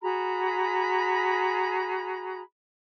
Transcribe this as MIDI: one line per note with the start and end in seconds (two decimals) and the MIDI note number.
0.03 2.41 66
0.03 2.41 68
0.03 2.41 82
0.03 2.41 83